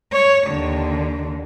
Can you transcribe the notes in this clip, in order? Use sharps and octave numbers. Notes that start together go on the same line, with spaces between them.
C#5
D#2 D3